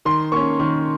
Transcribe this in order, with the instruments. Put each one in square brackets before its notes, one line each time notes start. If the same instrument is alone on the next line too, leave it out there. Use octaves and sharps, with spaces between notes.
[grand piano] D#3 C6
A#3 C#4 C#6
D#3